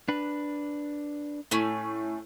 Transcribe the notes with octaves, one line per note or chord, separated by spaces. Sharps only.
D4 B4
A2 A3 C#4